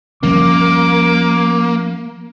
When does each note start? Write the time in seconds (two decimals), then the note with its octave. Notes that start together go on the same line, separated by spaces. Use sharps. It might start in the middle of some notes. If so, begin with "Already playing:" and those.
0.23 F3 G3 A#3 C#4 D6